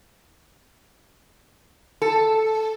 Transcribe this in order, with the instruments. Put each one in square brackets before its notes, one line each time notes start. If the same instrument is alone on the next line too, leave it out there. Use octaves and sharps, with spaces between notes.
[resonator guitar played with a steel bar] A4